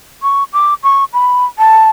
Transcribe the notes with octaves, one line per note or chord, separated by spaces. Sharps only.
C#6
D6
C#6
B5
A5